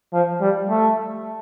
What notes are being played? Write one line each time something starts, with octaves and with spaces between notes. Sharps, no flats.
F3
G3
A3